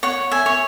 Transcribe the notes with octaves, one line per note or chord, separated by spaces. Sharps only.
C#5 F#5
E5 G#5
C#5